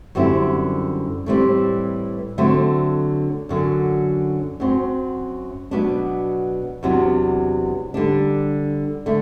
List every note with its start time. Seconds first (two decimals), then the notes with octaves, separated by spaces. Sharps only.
0.15 F#2 D3 G3 C4 E4
1.26 A2 E3 G3 C4
2.38 D3 F#3 A3 C4
3.49 F#2 D3 F#3
4.60 F#2 F#3 C4
5.71 B2 F#3 B3 D4
6.83 E2 C3 F#3 B3 D4
7.94 D3 G3 D4
9.06 D3 A3